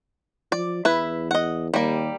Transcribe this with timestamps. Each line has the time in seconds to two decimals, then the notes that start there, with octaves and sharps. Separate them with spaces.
0.52 F3 D5
0.85 E2 E4 B4
1.31 D#5 F#5
1.74 D#2 G3 A#3